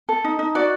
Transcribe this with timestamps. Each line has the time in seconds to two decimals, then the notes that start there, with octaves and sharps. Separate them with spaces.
0.09 A4
0.24 D#4
0.39 D#4
0.55 F#4 D5